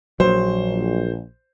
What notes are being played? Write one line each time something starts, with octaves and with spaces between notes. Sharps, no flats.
A#1 F#3 C5